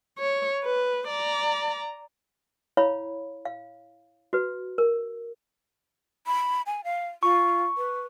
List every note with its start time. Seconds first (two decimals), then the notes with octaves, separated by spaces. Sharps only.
0.19 C#5
0.64 B4
1.08 D5 A#5
2.77 E4 C#5 F5 B5
3.45 F5
4.33 F#4 B4
4.78 A#4
6.27 B5
6.66 G#5
6.84 F5
7.23 F4 C#6
7.77 B4